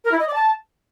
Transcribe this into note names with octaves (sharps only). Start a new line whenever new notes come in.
A#4
E4
D#5
D5
A5